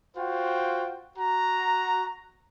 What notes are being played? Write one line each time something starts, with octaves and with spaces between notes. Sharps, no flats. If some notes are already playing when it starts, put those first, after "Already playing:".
F4 F#4 C5 G5
F#4 A#5